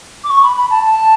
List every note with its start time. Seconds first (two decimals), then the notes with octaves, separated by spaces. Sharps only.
0.23 D6
0.29 C#6
0.42 B5
0.56 B5
0.70 A5
0.83 A5